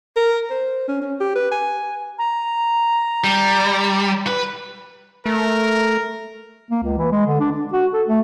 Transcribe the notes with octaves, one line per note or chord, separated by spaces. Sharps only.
A#4
C5
C#4
C#4
G4
B4
G#5
A#5
G3
B4
A3 A#4
A#3
C#2
E3
G#3
D3
D4
D4
F#4
A4
A3